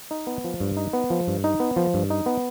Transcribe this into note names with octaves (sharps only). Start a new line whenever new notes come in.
D#4
B3
F3
G2
D#4
B3
F3
G2
D#4
B3
F3
G2
D#4
B3